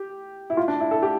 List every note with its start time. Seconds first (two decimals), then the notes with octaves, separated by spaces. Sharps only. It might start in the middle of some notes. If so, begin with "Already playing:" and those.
Already playing: G4
0.50 E4
0.57 F4
0.68 D4
0.80 E4
0.91 A4
1.03 G4